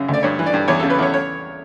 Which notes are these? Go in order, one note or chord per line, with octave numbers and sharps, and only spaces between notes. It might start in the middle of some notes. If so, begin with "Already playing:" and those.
Already playing: F#2 C#3
D2
D5
G2 C#5
E3
D5
G2
E2 C#5
C#3 A4
B4
E2 C#5
C#5